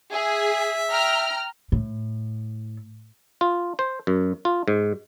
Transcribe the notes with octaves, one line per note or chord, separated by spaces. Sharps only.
G#4 E5
G5 A#5 F6
A2
F4
C5
F#2
F4
G#2